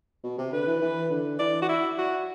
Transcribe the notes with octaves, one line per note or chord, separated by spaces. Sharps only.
B2
C3
D3 B4
E3
E3
D3
E3 D5
F#4
E4
F#4